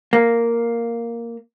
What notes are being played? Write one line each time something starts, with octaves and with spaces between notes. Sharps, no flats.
A#3